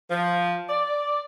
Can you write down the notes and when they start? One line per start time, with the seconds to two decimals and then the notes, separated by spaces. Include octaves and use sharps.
0.11 F3
0.69 D5